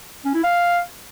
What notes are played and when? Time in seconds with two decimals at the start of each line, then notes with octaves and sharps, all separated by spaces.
0.25 C#4
0.34 E4
0.43 F5